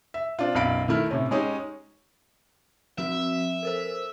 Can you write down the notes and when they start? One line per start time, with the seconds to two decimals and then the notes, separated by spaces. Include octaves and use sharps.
0.14 E5
0.39 C4 D4 F4
0.55 B1 F#2 F5 B5 D7
0.88 D#3 A3 E4 F6
1.11 A2 C3 C#4
1.31 G#3 C#4 D#4 G4 G#4
2.98 F3 C4 F#4 E5
3.63 A4 A#4 C5